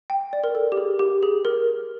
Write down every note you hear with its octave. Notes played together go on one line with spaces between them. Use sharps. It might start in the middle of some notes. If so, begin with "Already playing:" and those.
G5
D5
A#4
A4
G4
G#4
G4
G#4
A#4